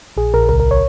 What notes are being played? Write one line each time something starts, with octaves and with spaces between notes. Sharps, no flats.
A#1 G#4
A#1 A#4
C#2 A#4
A#4
C#5